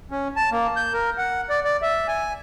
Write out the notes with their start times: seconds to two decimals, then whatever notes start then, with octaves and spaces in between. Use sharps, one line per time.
0.11 C#4
0.36 A5
0.52 A#3
0.76 G6
0.93 A#4
1.18 F#5
1.49 D5
1.65 D5
1.82 E5
2.08 G#5